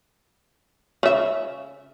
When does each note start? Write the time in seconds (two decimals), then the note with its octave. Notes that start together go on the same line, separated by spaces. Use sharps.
1.03 C#3 E5